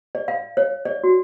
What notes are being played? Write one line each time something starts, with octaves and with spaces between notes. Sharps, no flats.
D5
F5
C#5
D5
F#4